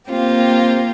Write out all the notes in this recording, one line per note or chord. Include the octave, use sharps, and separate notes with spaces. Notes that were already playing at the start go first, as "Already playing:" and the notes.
A#3 C4 F4 G4